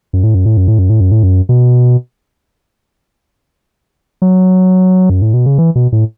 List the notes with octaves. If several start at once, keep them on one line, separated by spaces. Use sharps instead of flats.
F#2
A2
F#2
A2
F#2
A2
F#2
A2
F#2
A2
F#2
B2
F#3
F#2
A2
B2
C#3
E3
B2
A2